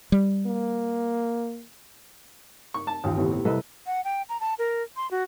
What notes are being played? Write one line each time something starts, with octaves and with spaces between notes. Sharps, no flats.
G3
A#3
C#6
A5
A1 D#2 F3 G5 D#6
D#2 A2 C3 B3
C3
C2 A4 B4 D#5
F#5
G5
A#5
A5
A#4
C6
F#4